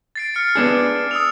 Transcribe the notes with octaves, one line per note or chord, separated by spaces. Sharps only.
A6 C7 D7
F6 C#7
B3 D4 G#4
D#6 E6 F7